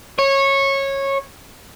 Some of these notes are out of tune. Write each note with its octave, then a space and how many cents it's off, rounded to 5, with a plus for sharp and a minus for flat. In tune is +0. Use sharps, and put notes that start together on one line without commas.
C#5 -15